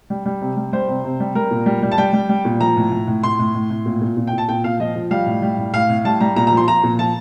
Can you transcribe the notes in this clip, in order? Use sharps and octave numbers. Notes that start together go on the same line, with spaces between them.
G3
G3
C3
G3
G3 C5
C3
C3
G3
G3 A#4
A#2
G3
G3
A5
G3 G5
G3
G3
A#2
F3 A#5
A2
A2
A2
A2 C6
A2
A2
A2
A#2
A#2
A#2
G5
A#2
A5
A#2 G5
A#2 F5
F3 D#5
F3
G3 F5
A2
G3
A2
A2 F5
A2
G3 A5
G3 A#5
A#2 A#5
A#5
F3
C6
F3 A#5
A#2
F3 A5